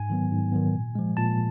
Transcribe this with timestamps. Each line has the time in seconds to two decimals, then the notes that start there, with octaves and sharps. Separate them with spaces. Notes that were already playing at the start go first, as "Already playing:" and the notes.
Already playing: G#2 G#5
0.10 D#3 F#3 B3
0.31 G#2
0.52 D#3 F#3 B3
0.74 A#2
0.95 F3 G#3
1.17 A#2 A5